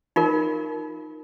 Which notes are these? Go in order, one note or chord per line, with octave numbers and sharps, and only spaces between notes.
D#4 F4 A#4